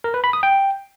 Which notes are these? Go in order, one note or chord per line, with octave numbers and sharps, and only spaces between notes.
A#4
B4
B5
D#6
G5